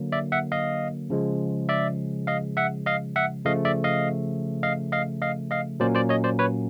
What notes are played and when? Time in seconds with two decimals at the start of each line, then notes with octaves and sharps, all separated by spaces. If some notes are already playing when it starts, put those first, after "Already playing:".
Already playing: D3 F#3 A#3
0.12 D5 E5
0.32 E5 F#5
0.52 D#5 F5
1.10 C#3 F3 G#3
1.69 D5 E5
2.27 D#5 F5
2.57 E5 F#5
2.86 D#5 F5
3.16 E5 F#5
3.45 C#3 F3 A3 D#5 F5
3.65 D5 E5
3.84 D#5 F5
4.63 D#5 F5
4.92 D#5 F5
5.22 D#5 F5
5.51 D#5 F5
5.80 A#2 F#3 A#3 C#4 C5 D5
5.95 C5 D5
6.09 C#5 D#5
6.24 C5 D5
6.39 B4 C#5